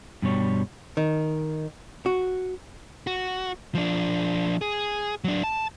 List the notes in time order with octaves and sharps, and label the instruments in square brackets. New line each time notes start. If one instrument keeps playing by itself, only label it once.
[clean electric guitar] G2 B2 G3 C#5
[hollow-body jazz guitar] D#3
F#4
[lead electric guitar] F#4
F3 D4
G#4
F#3 D4
A5